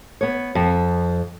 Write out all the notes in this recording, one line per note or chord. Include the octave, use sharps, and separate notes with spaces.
B3 C#5
F2